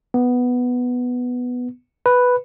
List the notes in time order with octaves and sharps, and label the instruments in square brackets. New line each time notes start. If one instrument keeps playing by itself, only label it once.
[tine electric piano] B3
B4